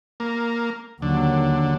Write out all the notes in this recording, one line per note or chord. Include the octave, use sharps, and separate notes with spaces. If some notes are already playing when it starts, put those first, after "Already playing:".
A#3
D#2 D3 F#3